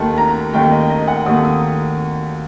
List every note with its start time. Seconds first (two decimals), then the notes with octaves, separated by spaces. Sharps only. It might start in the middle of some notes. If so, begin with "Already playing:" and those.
Already playing: D#2 D#3 A3 A5
0.18 A#5
0.53 D#2 D#3 A3 G5
0.72 D#5
0.90 D#5
1.08 F#5
1.26 D#2 D#3 A3 D#6
1.45 D#6